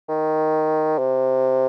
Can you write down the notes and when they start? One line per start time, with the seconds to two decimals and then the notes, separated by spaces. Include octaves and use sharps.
0.09 D#3
0.99 C3